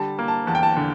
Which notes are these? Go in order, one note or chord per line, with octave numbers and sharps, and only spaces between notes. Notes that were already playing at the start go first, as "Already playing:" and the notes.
Already playing: D3 G3 A5
A#3
A5
E2 A5
G5
A5
D3